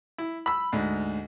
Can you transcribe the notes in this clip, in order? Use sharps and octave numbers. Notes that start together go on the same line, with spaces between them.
E4
B5 E6
D2 G#2